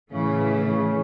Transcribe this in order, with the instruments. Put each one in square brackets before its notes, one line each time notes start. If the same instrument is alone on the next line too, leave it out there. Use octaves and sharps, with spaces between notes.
[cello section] A2 E3 A3 [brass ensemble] C#3
[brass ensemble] C#3